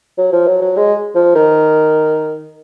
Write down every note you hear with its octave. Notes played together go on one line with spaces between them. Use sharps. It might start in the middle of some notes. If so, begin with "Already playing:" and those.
F#3
F3
F#3
F#3
G#3
F3
D#3